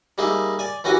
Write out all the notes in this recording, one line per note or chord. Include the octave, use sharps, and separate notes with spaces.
G3 A#3 D#4 G#4 E5
D5 G#5
E3 C#4 F#4 G4 A#4 G#5